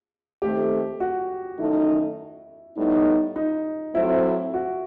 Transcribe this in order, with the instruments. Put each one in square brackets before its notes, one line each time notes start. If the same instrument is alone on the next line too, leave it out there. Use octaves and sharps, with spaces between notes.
[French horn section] D#2 D#3 A3 C4 [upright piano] G4
[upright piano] F#4
[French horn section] F#2 D#3 A3 D#4 A4 [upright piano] E4
[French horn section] A2 G3 B3 D#4
[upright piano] D#4
[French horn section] A2 F#3 A3 C4 [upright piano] E4
[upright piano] F#4